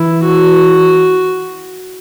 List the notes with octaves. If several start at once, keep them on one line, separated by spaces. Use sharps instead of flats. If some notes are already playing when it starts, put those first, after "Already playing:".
Already playing: E3 E4
F#4